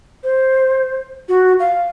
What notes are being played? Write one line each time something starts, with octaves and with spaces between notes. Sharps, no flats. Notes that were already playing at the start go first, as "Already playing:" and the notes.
C5
F#4
F5